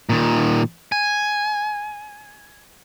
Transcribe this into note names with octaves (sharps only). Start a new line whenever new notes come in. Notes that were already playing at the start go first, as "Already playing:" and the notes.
A#2 D#3
G#5